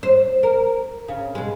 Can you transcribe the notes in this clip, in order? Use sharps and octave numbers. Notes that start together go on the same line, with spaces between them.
C5
A#4
C#3
B2 G#3